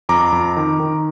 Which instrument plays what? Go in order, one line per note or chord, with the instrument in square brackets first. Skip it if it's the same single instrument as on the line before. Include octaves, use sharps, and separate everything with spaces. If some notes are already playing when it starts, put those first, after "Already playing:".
[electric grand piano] F2 A#5 D6
F2
D#3
D#3